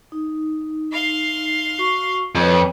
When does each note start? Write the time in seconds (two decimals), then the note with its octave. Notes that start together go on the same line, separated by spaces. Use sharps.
0.12 D#4
0.92 F5 C6
1.78 F#4 C#6
2.35 F2 B4 C#5